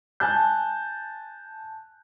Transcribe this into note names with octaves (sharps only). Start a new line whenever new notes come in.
G#5 A5 F#6 G6